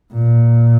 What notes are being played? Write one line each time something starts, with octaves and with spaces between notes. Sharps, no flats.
A#2